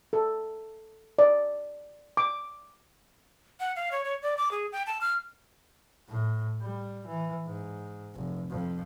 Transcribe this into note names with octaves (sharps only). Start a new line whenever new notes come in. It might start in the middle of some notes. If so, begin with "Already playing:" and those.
A4
D5
D6
F#5
F5
C#5
C#5
D5
D6
G#4
G5
A5
F6
A2
G3
E3
G#2
F1
F2